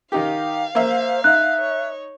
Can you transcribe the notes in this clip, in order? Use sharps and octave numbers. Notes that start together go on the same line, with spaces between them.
D#3 D#4 G4 F5
A#3 C5 E5
D#4 E5 F#6
C#5